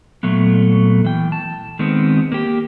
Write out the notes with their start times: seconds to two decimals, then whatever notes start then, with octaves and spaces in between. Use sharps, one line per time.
0.23 A#2 F#3 A3 B3
1.05 E3 G5
1.32 A5
1.79 D#3 G#3 B3 C4
2.32 A#3 G4